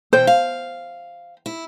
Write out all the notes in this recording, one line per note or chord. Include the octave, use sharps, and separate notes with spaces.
B2 E3 C5 G5
F5
E4